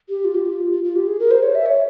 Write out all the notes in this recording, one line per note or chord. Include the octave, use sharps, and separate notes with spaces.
G4
F4
G4
F4
F4
F4
G4
G#4
A#4
C5
C#5
E5
C#5